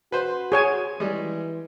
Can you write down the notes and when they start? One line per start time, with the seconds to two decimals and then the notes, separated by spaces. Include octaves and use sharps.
0.12 F#4 B4 C5
0.52 G#4 C#5 G#5
1.00 E3 G3 G#3